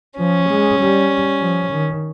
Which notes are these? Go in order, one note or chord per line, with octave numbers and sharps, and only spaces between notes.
F3 C#4
G#3
G3
F3
D#3